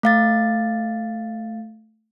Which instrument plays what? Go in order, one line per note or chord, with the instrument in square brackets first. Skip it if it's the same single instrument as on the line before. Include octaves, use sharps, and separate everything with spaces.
[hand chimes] A3 F5 A6